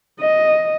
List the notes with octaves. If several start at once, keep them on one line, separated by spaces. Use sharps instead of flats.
D#5